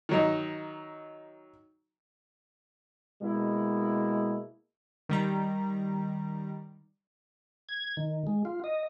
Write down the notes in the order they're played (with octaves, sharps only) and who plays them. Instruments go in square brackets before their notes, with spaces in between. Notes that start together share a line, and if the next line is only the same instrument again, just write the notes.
[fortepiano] D#3 F#3 D#4
[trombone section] B2 G#3 A#3 E4
[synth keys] D#3 G3 A#5
[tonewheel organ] G#6
D#3
G#3
F4
D#5